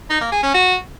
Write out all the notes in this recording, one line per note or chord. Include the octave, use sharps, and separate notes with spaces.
D#4
A#3
G#4
C#4
F#4